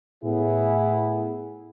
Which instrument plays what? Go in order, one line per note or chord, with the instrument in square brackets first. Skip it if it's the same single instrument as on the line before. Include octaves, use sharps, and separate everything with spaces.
[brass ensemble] A2 B3 E4 G#4